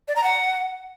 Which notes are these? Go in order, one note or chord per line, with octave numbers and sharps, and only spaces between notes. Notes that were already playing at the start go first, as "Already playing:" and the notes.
D5
A#5
F#5